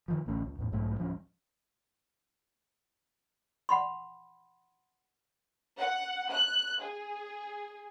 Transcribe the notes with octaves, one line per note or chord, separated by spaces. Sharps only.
C3 D#3 F3
A1 D2 A3 C#4
C#2
E2 A2
B1 G#2 F#3 A3
D1 F3 G3 C#4
F#5 B5 C6
F#5
F#6
G#4